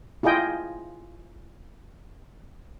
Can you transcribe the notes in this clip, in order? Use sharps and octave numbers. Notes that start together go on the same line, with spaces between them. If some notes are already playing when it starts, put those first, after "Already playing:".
E4 F4 G#4 D#5 G5